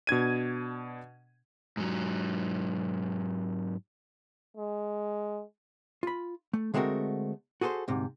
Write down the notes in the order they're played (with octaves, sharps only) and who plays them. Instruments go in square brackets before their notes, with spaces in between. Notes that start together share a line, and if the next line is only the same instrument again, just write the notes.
[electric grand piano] B2 D4 G#6 D#7
[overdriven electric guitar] G#2 F#3
[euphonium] G#3
[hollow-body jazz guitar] F4 B5
A3
D3 G#3 A3 C4 F#4 A#4
F#4 G#4 A4 B4 C5
D2 G#2 C3